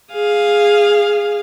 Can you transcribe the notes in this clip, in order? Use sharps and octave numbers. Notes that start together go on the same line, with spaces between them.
G#4 F5